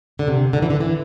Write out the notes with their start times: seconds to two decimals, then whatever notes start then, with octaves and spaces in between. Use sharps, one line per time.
0.19 D3
0.28 C3
0.53 D3
0.62 E3
0.70 D3
0.80 E3